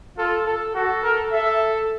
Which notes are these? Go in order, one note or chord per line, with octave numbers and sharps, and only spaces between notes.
F4 A4
A4
F#4 A4
A#4
A4 E5